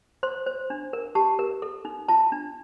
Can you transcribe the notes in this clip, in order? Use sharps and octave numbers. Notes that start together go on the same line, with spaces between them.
C5 C6
C5
D4
A#4
G4 A5
A#4
A4
D#4
F4 A5
D4